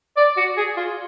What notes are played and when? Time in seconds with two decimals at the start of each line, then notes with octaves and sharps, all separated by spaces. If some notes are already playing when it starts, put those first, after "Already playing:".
0.17 D5
0.37 F#4
0.57 G#4
0.77 F4